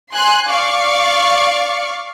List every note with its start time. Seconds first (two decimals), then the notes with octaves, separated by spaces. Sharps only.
0.12 G#5 C6 F#6
0.47 D5 F5 C#6 D6